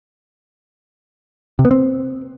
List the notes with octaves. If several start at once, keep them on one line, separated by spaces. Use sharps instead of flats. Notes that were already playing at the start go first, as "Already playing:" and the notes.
C3
B3
C4